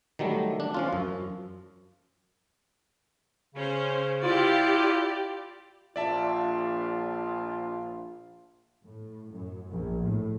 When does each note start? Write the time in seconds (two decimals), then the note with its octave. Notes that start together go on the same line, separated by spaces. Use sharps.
0.19 D#3 F#3 G3 A3
0.60 D4
0.74 F3 C#4 F4
0.93 F#2
3.55 C#3 C#4 C5
4.23 E4 F4 G4 D5
5.96 A#1 F4 D5 E5 A5
8.83 A2
9.30 F#2
9.70 A#1
10.03 A2